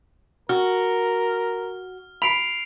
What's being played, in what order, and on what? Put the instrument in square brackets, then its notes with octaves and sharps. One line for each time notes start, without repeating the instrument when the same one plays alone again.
[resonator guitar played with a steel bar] F#4 [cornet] A#4 [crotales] F6
[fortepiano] B5 [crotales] C7 D7 F7